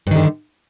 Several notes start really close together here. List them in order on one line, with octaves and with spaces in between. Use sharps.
G2 D#3 D3